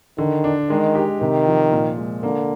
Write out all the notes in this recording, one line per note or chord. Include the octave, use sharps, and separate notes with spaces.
D3 D#3
D4
D#3 G#3
G4
C3 D#3
F3
A#2
G#3
D3 A#3